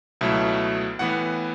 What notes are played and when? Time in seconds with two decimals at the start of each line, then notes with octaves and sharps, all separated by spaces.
0.21 C#2 B2 F#3 A3 E4 E5
0.99 A2 E3 B3 F#5